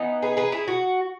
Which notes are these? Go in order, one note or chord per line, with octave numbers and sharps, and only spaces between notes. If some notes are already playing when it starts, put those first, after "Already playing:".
Already playing: E3 B3 D#4
G#4 B4
G#4 B4
E4 G#4
F#4